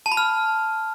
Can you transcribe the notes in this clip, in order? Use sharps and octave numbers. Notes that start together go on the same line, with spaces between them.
A5
B5
F6